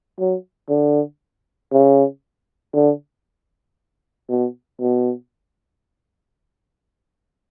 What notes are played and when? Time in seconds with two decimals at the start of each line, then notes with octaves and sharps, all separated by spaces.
0.19 F#3
0.69 D3
1.73 C#3
2.74 D3
4.29 B2
4.81 B2